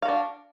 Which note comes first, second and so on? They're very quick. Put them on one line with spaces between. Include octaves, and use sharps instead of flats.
F5 F#4 D4